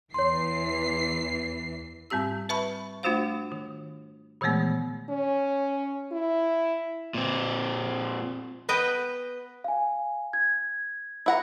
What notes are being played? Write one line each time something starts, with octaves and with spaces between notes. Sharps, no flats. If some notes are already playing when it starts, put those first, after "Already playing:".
E2 E3 C#5 C6 C7
G#2 G3 C4 G4 E6
B4 E5 A5 B5 C#6
A3 D4 F4 F#4 C5 F5
D#3
A#2 D#3 E3 G#3 A3 B3
C#4
E4
A#2 C4
B3 B4 D#5 G5
F5 G#5
G#6
E4 F#5 A#5